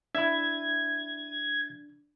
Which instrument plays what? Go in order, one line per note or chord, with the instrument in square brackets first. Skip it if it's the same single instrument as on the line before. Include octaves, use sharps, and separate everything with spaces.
[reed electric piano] D4 [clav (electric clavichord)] E4 E5 [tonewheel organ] G#6